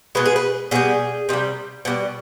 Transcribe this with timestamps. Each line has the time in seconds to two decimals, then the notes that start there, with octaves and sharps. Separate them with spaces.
0.15 B2 G#3 B4
0.26 G#4
0.36 B4
0.71 B2 G3 G#4
1.29 C3 D#3
1.33 G3
1.85 B2 G3